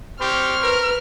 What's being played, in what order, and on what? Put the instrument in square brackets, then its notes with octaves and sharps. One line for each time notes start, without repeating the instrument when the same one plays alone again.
[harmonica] C4 C6 C#6 [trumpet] G4 [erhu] F6
[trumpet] A#4 [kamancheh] B4